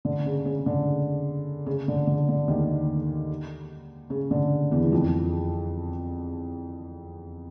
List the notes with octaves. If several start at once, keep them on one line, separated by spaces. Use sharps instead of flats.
D3
C#3
C#3
D3
C#3
D3
D3
D3
D#2 D#3
C#3
D3
E2 E3
E3
F2 F3